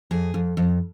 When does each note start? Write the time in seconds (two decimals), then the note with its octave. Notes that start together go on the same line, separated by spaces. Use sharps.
0.11 F2 G#4
0.34 F2
0.57 F2